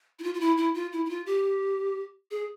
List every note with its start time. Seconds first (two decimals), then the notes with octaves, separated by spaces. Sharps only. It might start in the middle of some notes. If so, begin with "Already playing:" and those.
0.19 E4
0.23 F4
0.34 F4
0.40 E4
0.57 E4
0.75 F4
0.92 E4
1.06 E4
1.09 F4
1.26 G4
2.31 G#4